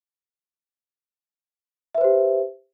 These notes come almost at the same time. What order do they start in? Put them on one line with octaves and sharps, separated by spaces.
E5 B4 C5 G4